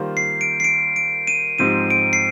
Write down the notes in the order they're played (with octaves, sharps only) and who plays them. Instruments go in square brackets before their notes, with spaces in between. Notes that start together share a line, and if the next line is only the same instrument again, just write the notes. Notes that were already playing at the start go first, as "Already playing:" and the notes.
Already playing: [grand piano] D#3 G3 A#3 F4 C5
[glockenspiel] C7
D7
C7
D7
D7
D#7
[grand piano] G#2 F3 C4 D#4 G4 [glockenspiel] D#7
[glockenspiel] D7
C7